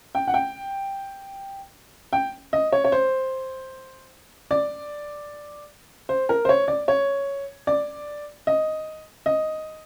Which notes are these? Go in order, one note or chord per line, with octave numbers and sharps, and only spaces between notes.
G5
F#5
G5
G5
D#5
C#5
C#5
C5
D5
C5
A#4
C5
C#5
D5
C#5
D5
D#5
D#5